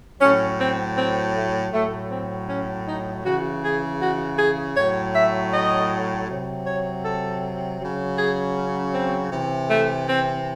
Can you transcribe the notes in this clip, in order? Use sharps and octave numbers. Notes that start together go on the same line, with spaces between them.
A2 F#3 C#4
C4
C4
A3
A2 F#3 A3
C4
C#4
D#4
C#3 E3 F#4
G#4
F#4
G#4
A2 F#3 C#5
E5
D#5
C3 F#3
C#5
A4
C#3 F#3
G#4
C#4
C4
C3 E3
A3
C4